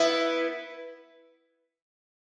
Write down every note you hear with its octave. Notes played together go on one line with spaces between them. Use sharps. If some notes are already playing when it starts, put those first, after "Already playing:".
Already playing: B3 E4